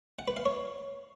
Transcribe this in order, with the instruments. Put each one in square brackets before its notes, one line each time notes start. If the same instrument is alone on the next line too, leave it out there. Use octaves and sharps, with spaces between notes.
[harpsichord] F#5
B4
F5
C#5